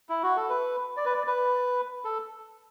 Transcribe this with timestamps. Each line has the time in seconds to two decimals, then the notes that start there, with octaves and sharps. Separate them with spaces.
0.09 E4
0.23 F#4
0.37 A4
0.49 B4
0.97 D5
1.05 B4
1.13 D5
1.27 B4
2.05 A4